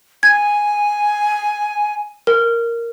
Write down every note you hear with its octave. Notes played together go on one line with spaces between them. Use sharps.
G#5 G#6
A#4